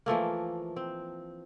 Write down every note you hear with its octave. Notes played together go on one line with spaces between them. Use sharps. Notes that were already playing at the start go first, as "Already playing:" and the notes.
E3 F3 A3 A#3
C4